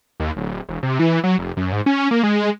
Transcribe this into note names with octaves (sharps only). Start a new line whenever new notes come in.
D#2
D1
E1
C3
E3
F#3
F1
F#2
G#2
C#4
A#3
G#3